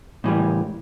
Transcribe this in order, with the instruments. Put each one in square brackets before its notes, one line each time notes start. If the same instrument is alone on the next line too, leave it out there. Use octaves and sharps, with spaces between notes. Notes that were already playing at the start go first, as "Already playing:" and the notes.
[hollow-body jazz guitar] A2 E3 G3